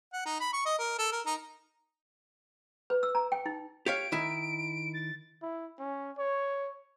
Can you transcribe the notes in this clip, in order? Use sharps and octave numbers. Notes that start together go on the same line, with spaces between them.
F#5
D#4
B5
C#6
D#5
A#4
A4
A#4
D#4
B4
E6
A#5
G5
D#4
G4 C#5 F5 D7
D#3 E4
A6
E4
C#4
C#5